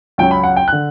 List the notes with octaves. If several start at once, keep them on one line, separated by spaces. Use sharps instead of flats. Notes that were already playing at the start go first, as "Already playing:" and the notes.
C#2 C#3 F#3 C#4 G5
B5
F#5
G5
D3 F#6